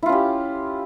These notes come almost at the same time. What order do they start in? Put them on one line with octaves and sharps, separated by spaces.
E4 F4 C#4 G4